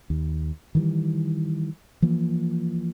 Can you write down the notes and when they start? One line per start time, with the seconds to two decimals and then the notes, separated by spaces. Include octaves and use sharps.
0.10 D#2
0.75 D#3 E3 G3
2.02 E3 F3 A#3